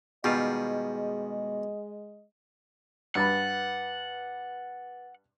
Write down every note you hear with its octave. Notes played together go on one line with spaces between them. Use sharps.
B2 D#3 G3 G#3 F4 G#4 D#5
G2 B4 F#5 B5 A6